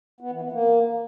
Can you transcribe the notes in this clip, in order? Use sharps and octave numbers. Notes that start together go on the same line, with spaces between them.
B3
E3
B3
A#3